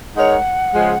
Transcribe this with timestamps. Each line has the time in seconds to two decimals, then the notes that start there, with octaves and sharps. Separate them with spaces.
0.16 G#3 D#4 A#4 C#5 F#5
0.74 C#3 F3 G#3